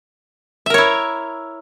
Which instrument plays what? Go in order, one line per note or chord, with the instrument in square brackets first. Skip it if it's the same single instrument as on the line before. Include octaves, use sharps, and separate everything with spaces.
[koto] E5
A#4
C#5
E4